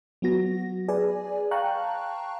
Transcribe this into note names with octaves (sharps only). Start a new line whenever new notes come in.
F#3 B3 F#4 A#6
G#4 B4 D5 G#5
F5 G5 A5 A#5 C#6 F#6